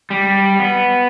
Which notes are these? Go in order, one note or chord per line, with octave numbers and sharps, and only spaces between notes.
G3
B3